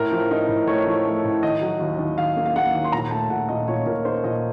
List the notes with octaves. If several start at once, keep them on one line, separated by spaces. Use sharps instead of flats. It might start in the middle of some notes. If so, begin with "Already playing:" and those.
Already playing: A2 A#4
F3
D#4
A2
A3 C#5
F3
A3
A2
D#3 D#5
F#3
D#2
D#2
D#3 F5
A#3
F5
A#3 F#5
D#2
C6
A#2 A#5
A3 A5
A#2 F#5
A#2 D#5
A#2 C#5
A#2 A#4
D#4 C5
A#2 D#5